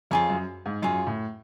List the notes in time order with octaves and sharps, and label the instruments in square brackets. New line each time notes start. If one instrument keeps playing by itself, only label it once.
[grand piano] F2 [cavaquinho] F4 G#4 C#5
[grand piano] F#2
G#2
[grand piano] F#2 [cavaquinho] F4 G#4 C#5
[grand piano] A2